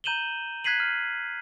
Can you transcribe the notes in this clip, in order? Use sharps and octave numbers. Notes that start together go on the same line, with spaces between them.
A#5 G6 D#7 E7 F#7 G7
F#6 G#6 B6 C7 D#7 F#7
F6